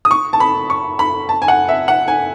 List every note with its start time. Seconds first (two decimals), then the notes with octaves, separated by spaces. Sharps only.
0.05 D#6
0.11 C#6
0.33 A5
0.40 B5
0.70 C#6
0.99 B5
1.29 A5
1.42 G#5
1.48 F#5
1.69 E5
1.88 F#5
2.08 G#5